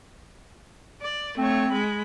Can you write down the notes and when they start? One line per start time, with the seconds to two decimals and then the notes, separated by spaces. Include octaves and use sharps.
1.02 D5
1.38 A3 C4 C#5
1.71 G#3 B5